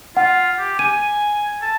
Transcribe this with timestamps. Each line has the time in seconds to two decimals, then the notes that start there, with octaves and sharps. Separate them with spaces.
0.17 F4 F#5
0.58 G4
0.79 G#5 D#7
1.62 A5